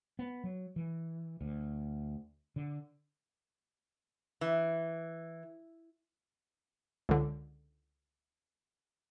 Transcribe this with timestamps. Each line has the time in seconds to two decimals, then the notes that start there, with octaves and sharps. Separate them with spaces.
0.19 B3
0.44 F#3
0.76 E3
1.41 D2
2.56 D3
4.41 E3
7.09 C#2 D3